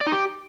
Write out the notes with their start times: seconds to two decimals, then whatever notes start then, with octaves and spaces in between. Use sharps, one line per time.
0.01 D5
0.07 D#4
0.12 G4